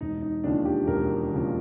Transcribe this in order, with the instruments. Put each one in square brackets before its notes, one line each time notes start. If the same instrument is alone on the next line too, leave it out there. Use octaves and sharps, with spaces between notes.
[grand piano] E1 D#4
D#4
D#2 C#3 F3 D4
G4
E1 A#4
D#2 C#3 F3